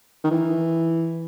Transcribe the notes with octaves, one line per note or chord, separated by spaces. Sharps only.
D#3
E3